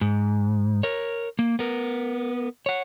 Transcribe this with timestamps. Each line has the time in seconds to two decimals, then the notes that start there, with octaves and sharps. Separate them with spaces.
0.01 G#2
0.83 A#4 C#5
1.39 A#3
1.59 B3 A#4
2.66 C#5 F#5